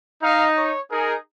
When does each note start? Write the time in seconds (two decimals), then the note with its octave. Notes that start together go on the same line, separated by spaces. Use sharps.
0.23 D#4 F5
0.57 C#5
0.91 D#4 G#4 A#4